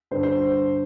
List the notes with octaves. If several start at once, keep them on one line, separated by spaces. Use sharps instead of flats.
G2 D3 C5
C5